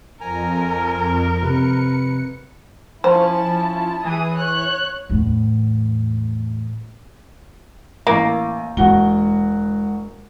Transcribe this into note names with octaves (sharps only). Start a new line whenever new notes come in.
F2 A#4 G#5 A#5
C3 B4 C#7
F3 C#4 E4 C5 A5
E3 G#4 D#6
C#5 F#6
E2 A2
A1 A#3
E1 G#3 D#4 F#4 G7